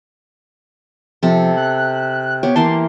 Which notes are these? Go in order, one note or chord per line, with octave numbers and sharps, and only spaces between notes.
C3 F3 A4
F#6
B3 G4 C#5
E3 A#3 A5 C6